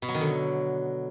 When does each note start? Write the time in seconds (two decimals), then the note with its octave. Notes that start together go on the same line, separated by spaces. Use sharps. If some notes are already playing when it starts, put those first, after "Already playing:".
0.02 B2
0.08 F#3
0.15 D#3
0.21 D3